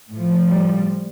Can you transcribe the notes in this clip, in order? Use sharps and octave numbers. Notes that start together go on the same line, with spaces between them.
A2 F3
G3